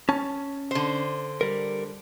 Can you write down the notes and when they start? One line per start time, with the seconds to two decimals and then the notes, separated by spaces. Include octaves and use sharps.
0.09 C#4 A5
0.71 D3 C5
1.41 G3 A#4